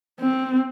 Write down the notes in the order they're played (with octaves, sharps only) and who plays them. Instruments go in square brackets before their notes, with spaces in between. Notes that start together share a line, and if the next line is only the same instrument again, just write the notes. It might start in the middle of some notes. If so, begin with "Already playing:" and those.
[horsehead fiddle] C4